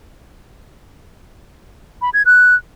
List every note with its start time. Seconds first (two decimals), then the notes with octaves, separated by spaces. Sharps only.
2.02 B5
2.14 G#6
2.26 F#6